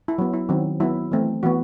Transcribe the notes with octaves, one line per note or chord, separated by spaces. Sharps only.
E4
F#3 B3
E4
D#3 F#3 C4
F#3 B3 E4
E3 A3 C4
E3 B3 F#4